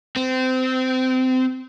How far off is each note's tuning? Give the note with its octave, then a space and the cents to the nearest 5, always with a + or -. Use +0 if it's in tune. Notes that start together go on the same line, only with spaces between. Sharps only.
C4 -25